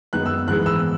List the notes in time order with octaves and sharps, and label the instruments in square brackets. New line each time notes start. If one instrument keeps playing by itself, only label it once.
[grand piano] F#2 D#3 G#3 B3 D#4 F#6
E6
G#2 E3 G#3 B3 F#6
E6